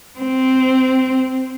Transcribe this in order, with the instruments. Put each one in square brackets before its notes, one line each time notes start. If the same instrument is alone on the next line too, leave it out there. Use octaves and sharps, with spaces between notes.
[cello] C4